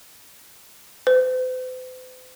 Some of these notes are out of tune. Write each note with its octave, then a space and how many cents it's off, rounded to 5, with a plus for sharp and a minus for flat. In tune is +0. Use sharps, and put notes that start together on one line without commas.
C5 -45